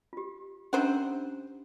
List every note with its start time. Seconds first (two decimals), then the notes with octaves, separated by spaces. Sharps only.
0.13 F4 G4
0.73 C3 C#4 D4 C5 F#5 A#5